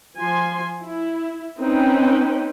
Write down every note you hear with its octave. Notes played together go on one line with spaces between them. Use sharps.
F3 G#5 C6
E4
C4 C#4 D#4 B4 G5